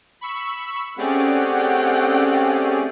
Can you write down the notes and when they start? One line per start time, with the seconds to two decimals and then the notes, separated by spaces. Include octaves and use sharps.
0.21 B5 C#6 E6
0.98 A3 C4 C#4 G4 G#4 D5 F#5 G5